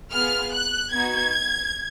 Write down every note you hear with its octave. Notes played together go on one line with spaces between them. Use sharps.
B3 F4 G#4 F6
F#6
B3 D#4 F#4 G#6